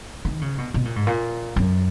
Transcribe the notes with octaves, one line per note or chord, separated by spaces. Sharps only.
D#3
C#3
B2
B2
A#2
G#2
A#2
F#2